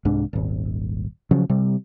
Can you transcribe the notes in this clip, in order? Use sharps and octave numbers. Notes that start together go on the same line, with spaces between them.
C2 G#2 D4
D#1 G#1
C#3 F3 F#3 C#4
C3 G3